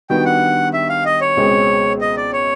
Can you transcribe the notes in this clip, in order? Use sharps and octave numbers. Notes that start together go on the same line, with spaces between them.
D#3 G3 B3 D4 F#4 G5
F#5
E5
F5
D#5
C#5
C#2 B2 G#3 C4
D#5
D5
C#5